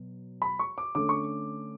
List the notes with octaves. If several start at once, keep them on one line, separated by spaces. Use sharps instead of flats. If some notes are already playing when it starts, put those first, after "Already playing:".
Already playing: B2 F#3
B5
C#6
D6
D3 A3 C#4 D6
C#6